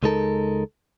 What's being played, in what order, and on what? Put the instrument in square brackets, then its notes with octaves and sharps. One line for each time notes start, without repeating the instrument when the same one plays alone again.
[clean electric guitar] C#2 G#3 D#4 A4 A#4